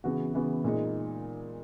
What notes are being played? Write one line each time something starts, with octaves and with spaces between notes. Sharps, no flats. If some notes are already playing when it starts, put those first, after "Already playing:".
C#3 E3 B3 F#4
C#3 E3 B3 F#4
A#2 G#3 D#4